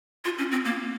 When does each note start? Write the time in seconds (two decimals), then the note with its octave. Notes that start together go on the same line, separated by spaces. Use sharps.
0.25 F4
0.38 C#4
0.52 C4
0.65 A#3